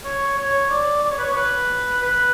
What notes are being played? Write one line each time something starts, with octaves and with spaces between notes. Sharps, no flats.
C#5
C#5
D5
D5
C#5
B4
C#5
B4
B4